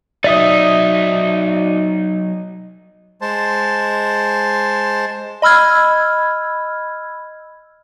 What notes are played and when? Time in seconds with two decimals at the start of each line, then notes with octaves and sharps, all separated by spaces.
0.24 F#3 D#4 D5 E5 D#6
3.21 G#3 C5 A5
5.42 D#5 B5 E6 F6 G#6